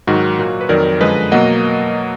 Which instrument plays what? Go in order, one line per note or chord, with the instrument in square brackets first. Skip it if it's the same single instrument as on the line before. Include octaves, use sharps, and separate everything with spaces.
[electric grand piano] G#2 D#3 F#3 F#4
A#2 F#3 A#3
B4
F2 D#3 F#3 A#4 D5
F#2 D3 F3 G#3 B4 D#5
B2 F#3 A#3 D#5 F#5